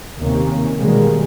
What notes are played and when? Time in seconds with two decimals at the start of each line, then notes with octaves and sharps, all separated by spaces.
0.20 D#2 C3 D#3 A#3 C#4
0.79 B2 D#3 E3 G3 G#3 A#3